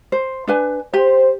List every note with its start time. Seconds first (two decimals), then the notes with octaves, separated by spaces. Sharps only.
0.12 C5
0.47 D4 B4 G#5
0.94 G4 C5